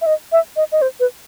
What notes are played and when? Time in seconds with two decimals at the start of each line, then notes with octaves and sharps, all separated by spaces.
0.01 E5
0.06 D#5
0.32 E5
0.56 D#5
0.72 D#5
0.82 C5
1.00 B4